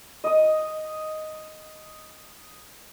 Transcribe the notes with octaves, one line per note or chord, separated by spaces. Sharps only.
D#5 D#6